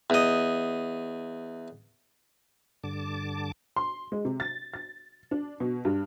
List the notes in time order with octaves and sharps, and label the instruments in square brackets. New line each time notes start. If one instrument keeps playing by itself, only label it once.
[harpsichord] E2 D#5
[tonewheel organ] G2 D3 A5 D6
[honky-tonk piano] C6
G#3
C3
A6
A6
D4
B2
G2